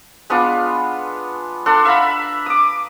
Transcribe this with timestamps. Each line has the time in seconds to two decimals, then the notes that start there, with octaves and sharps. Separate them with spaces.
0.30 G#3 B3 D4 F4
1.66 D4 A4 F#5 C6
1.85 E5 F5 A#5 B5
2.46 D6 D#6